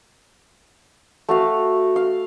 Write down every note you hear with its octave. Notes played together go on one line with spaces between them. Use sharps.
A3 F#4 F5
F5